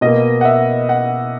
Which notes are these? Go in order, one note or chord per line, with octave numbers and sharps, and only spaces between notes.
B2 A#3 D#5
F#5
E5
F#5